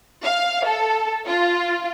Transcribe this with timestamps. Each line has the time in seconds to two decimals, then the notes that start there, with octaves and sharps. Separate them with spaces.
0.22 F5
0.65 A4
1.27 F4